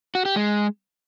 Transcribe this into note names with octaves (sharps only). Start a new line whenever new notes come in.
F#4
G4
G#3